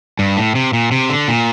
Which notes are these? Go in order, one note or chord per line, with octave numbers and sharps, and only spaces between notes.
G2
A2
C3
A#2
C3
D3
A#2